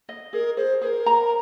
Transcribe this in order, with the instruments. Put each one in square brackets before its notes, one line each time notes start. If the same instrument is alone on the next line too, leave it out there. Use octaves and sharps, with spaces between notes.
[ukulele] D#5
[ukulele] G#4 [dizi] A#4
[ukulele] G#4 [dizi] C5
[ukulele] G#4 [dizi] A#4 C5
[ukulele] A#5